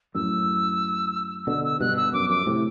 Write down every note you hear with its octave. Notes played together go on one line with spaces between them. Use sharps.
F#2 A2 E6
B2 D3 E6
E6
G2 B2 F#6
E6
F#2 D6
F#2 D6
A2 C3